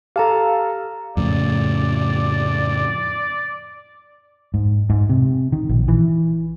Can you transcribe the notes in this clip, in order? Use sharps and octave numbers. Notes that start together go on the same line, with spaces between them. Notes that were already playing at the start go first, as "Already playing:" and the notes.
G4 A4 F5 A5 A#5
F2 A2 C#3 D5
G#2
G#2
C3
D#3
A#1
E3